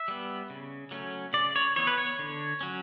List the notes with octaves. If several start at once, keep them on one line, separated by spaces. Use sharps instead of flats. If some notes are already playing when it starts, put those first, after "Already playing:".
Already playing: E5
G3 B3
C#3
F#3 A3 C#4
C#3 D5
C#5
E3 B3 C#5
B4
C#5
D3
F#3 C#4